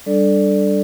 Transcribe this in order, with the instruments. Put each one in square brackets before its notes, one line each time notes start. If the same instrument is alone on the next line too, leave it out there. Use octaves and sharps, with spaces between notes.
[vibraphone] G3 D4 A4 D5